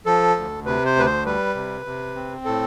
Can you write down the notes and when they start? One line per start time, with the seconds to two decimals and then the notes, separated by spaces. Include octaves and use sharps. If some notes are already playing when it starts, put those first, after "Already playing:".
0.06 F3 A4
0.36 D2
0.65 C3 B4
0.85 C5
0.96 D2 B4
1.06 C5
1.26 G3 B4
1.55 C3
1.85 C3
2.15 C4
2.45 A2 A4